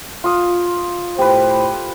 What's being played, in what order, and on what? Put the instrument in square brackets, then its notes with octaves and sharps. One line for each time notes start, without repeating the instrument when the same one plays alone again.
[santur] F4 D#6
[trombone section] A2 C5 [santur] G4 B4